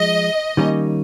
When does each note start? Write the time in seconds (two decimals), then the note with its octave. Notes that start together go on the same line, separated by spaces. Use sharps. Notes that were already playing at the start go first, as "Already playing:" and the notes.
Already playing: F3 G#3 D#5
0.57 D#3 G3 A#3 C#4